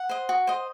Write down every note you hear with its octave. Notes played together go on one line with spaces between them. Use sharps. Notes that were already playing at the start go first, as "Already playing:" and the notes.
Already playing: F#5
C5 D#5
F#4
C5 D#5